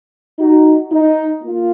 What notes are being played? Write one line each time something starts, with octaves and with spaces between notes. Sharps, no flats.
D#4 F#4
D#4
A#3 F4